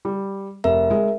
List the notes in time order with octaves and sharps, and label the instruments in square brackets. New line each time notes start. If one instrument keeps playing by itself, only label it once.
[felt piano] G3
[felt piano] F1 [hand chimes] A#4 E5
[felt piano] G#3